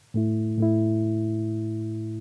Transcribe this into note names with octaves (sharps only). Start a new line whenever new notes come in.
A2 A3 E4
A2 A3 E4